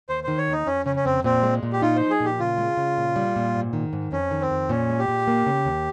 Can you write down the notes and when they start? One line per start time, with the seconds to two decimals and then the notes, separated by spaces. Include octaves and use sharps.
0.09 D#2 C5
0.24 D#3 C5
0.38 C#5
0.48 D#2 D#4
0.66 F2 C#4
0.86 C#3 C#4
0.96 C#4
1.05 F2 C4
1.24 A#2 C4
1.43 G#3
1.63 A#2
1.73 G4
1.82 D#4 F4
1.96 F3 C5
2.10 G#4
2.20 A#2 G4
2.39 C#3 F4
2.58 G#3
2.77 C#3
2.97 A#2
3.16 G3
3.36 A#2
3.54 G#2
3.73 D#3
3.93 G#2
4.12 F2 C#4
4.31 D#3
4.41 C4
4.51 F2
4.69 A#2 C#4
4.89 G#3
4.99 G4
5.08 A#2
5.28 A#3
5.46 C#3
5.65 D#2